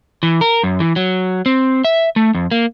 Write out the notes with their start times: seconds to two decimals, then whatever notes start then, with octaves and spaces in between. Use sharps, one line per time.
0.23 E3
0.41 A#4
0.63 F#2
0.80 E3
0.96 F#3
1.46 C4
1.84 E5
2.16 A3
2.35 F2
2.51 A#3